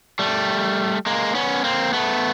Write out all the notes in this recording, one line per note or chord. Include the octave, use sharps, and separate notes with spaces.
G3 A3
G#3 A#3
B3 C#4
A#3 C4
A3 B3